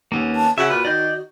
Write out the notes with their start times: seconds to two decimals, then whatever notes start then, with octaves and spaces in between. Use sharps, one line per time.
0.12 D#2 A#3 B3 C#4
0.36 A5
0.58 C#3 F#4 E5 F#5
0.70 A#2 B4
0.85 D#3 D5 D#5 G6